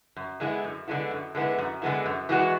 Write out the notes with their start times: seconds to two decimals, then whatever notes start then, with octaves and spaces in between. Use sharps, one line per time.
0.16 F#2
0.40 D3 G#3 B3 E4
0.64 F#2
0.88 D3 G#3 B3 E4
1.11 F#2
1.35 D3 G#3 B3 E4
1.58 F#2
1.82 D3 G#3 B3 E4
2.06 F#2
2.29 E3 G#3 B3 F#4